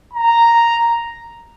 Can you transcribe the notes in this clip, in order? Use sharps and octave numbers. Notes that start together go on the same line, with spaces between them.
A#5